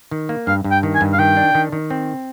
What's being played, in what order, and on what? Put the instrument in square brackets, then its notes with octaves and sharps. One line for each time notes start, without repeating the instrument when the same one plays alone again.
[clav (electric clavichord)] D#3
A#3
[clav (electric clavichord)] G2 [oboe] F5
[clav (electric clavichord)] G2
[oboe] G5
[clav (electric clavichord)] D#3
[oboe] G#5
[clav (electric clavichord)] G2
[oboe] F5
[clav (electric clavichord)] D#3 [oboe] G5
[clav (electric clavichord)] D4
D#3
D#3
C4